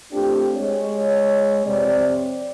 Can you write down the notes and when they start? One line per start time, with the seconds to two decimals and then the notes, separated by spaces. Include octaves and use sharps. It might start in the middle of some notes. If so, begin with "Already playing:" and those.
0.12 A3 C4 D4 F4 G4
0.55 G#3 C#5
1.66 F2 C3 C4 D5